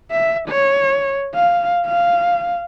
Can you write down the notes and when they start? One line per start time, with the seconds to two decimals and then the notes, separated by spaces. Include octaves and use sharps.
0.11 E5
0.48 C#5
1.35 F5
1.86 F5